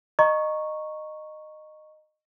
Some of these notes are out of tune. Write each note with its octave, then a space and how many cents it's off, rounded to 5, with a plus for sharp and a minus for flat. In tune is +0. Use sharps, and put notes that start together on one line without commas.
D#5 -15 A#5 +0 C#6 -5